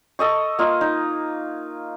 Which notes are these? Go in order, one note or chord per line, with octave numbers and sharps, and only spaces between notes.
A4 D#5 C#6
A#3 F4 D#5
D#4